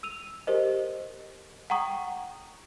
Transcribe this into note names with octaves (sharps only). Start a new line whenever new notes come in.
E6 D#7 F7
G4 A#4 C5 D#5
F#5 G5 A#5 C#6 D#6